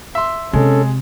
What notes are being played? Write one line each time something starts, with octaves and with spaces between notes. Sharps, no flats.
E5 C6
C3 G#3 C#4 A4